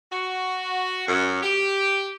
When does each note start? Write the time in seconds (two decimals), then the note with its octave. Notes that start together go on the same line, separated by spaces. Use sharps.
0.12 F#4
1.08 F#2
1.43 G4